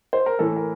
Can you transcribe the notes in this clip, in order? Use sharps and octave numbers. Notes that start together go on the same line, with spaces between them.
C5
A#4
A2 E3 A4
A#4